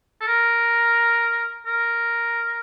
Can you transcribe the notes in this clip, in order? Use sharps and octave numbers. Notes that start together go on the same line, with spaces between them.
A4
A#4
A#4